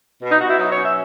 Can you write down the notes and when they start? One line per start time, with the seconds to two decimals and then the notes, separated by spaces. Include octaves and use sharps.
0.22 B2
0.31 D#4
0.41 B2 F#4
0.49 E4
0.59 F#3 D#4
0.71 C#5
0.77 C#4
0.83 E5